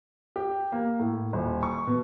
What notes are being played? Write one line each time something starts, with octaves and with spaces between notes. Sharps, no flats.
G4
A#3
A2
D#1
C#6
B2